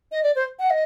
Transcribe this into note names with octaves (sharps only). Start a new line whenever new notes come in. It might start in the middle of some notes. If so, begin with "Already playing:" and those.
D#5
D5
C5
F#5
D#5